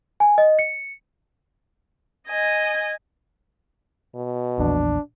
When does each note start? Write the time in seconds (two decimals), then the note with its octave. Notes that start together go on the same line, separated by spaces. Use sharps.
0.20 G#5
0.38 D#5
0.59 C#7
2.28 D#5 G#5
4.15 B2
4.59 A#1 E2 A#2 D4